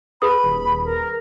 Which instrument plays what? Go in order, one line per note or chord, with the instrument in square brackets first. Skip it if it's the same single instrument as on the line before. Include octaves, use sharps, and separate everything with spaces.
[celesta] G#4 B4 D#6 [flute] B5
[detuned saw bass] D#1
[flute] A#4